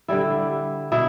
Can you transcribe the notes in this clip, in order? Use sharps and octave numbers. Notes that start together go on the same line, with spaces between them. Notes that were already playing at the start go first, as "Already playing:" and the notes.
D3 G3 E4
B2 E4